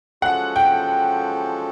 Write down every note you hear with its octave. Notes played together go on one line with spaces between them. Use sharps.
F3 G#3 C#4 F#4 A4 F#5
G5